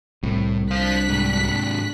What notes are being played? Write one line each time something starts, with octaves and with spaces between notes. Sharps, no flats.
C2 A2
D4 C5 F5 F#6 B6
G#2 C3